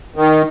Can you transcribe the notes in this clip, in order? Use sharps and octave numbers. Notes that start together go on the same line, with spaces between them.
D#3